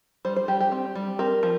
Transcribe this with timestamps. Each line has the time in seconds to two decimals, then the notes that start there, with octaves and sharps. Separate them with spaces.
0.25 G3 C5
0.36 C5
0.48 G3 G4
0.60 G4
0.72 C4
0.95 G3
1.19 C4 A#4
1.43 F3